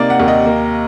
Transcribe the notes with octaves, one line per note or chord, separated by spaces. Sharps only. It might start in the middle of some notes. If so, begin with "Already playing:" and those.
Already playing: C3 A#3 D#4 D5
F#5
D#2
D#5
A#3